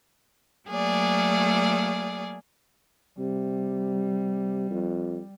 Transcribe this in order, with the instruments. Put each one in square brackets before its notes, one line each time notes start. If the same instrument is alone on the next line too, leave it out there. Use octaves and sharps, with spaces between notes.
[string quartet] F#3 A3 A#3 G#4 D5
[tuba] C3 [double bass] G3
[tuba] F2